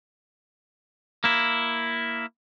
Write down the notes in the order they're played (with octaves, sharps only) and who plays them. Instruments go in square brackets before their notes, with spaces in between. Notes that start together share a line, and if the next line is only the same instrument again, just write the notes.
[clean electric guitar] A#3 E4